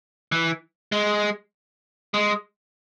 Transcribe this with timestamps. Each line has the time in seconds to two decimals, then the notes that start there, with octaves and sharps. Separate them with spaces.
0.32 E3
0.92 G#3
2.14 G#3